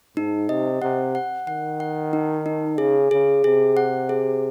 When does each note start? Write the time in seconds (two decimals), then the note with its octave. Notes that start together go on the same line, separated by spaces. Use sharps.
0.16 G#2 D#4
0.49 C3 D#5
0.82 C3 F#5
1.15 F#5
1.47 D#3 F#5
1.80 F#5
2.13 D#4
2.46 D#4
2.78 C#3 G#4
3.11 C#3 G#4
3.44 C3 G#4
3.77 F#5
4.09 G#4